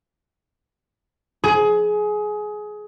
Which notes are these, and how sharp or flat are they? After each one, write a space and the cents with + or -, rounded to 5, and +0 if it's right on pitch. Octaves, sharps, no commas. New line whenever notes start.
G#4 +20